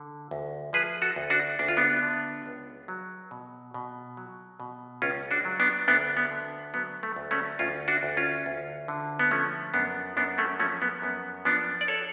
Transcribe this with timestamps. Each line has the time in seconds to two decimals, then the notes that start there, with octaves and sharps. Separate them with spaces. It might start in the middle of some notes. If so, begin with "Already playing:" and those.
Already playing: D3
0.31 D2
0.73 F3 G#4 B4
1.02 F#4 A4
1.16 D2
1.30 D4 F#4
1.59 D2 D4
1.68 F4
1.77 B3 D4
2.02 D3
2.46 C#2
2.88 F#3
3.31 B2
3.74 B2
4.17 F#3
4.60 B2
5.02 C#2 C#4 F4
5.31 D4 F#4
5.45 F#3
5.60 B3 D4
5.88 D2 B3 D4
6.17 B3
6.31 D3
6.74 F#3 B3
7.03 A3
7.16 D2
7.31 A3 C#4
7.59 D2 C#4 F4
7.88 D4 F#4
8.03 D2
8.17 C#4 F4
8.46 D2
8.88 D3
9.19 B3
9.31 F3 A3 C#4
9.74 F#2 B3 D4
10.17 F#2 B3 D4
10.38 A3 C#4
10.59 F3 A3 C#4
10.82 B3
11.02 F#2 B3
11.45 F3 B3 D4
11.81 D5
11.88 A4 C#5